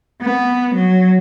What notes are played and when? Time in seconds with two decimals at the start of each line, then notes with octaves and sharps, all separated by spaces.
0.22 B3
0.75 F#3